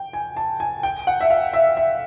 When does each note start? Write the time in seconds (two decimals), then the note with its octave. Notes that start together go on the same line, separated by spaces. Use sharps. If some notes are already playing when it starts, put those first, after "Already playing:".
Already playing: G5
0.13 G#5
0.37 A5
0.60 G#5
0.83 G5
1.07 F#5
1.21 E5
1.30 F5
1.53 E5
1.77 E5